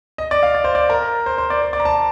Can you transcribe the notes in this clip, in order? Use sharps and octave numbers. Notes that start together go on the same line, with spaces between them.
D#5
D5
F5
D5
C5
D5
A#4
C5
C5
D5
C5
D5
A#5
A5